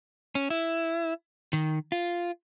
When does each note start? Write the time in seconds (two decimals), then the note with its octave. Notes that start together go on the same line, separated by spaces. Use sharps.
0.35 C#4
0.50 E4
1.53 D#3
1.92 F4